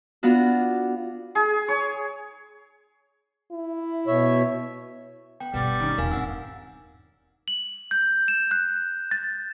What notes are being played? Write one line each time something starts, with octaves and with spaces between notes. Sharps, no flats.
B3 D4 F4 F#4
G#4
C#5
E4
B2 C#5 E5
B3 G5
G1 B2 G3 B3
D#3 C#4
D#1 C#2 A#4 F5 G#5
G2 C4 F#5 E6
F#7
G6
E7
F#6
A6